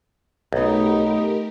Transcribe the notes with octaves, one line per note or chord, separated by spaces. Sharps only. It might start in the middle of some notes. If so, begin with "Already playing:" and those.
B1 A3 B3 D#4 G4 A#4